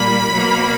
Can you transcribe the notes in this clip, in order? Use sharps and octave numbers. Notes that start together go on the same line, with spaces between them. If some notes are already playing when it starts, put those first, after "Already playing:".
Already playing: A#2 G3 A#3 B5
B2 F#3 A#3